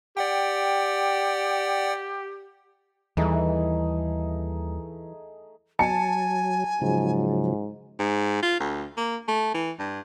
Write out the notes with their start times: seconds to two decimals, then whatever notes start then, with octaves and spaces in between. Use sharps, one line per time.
0.17 G4 D5 F#5 G5
3.17 D#2 E3 G3 A3 D#4 G#4
5.79 F#3 G#5 A5 C#7
6.82 G#2 C#3 F3 F#3
7.99 G#2
8.42 F4
8.60 D2
8.97 A#3
9.28 A3
9.54 E3
9.79 G2